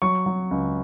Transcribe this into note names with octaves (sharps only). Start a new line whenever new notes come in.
F#3 C#6
F#3
C#2